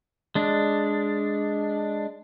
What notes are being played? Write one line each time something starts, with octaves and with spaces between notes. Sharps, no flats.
G#3 D4